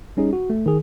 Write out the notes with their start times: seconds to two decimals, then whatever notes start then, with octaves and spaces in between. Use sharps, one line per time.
0.17 G3 C#4 D#4 G#4
0.33 F#4
0.50 A3
0.66 D#3 G#4